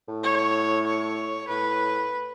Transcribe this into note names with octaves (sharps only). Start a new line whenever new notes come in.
A2
C#5
C#5
A2 B4